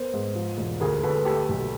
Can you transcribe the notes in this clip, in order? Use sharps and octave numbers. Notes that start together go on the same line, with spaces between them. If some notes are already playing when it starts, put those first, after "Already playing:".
Already playing: B3 A#4 C5
G#2
F3
E1
D2 G#4 A#4
D2 A4 B4
A3 G4 A4
B1